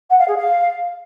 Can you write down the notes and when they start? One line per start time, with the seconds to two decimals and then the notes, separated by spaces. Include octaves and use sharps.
0.10 F#5
0.19 F5
0.28 G#4
0.37 F5